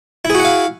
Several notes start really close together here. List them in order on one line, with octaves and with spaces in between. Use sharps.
E4 G#4 F#4 F#5 F5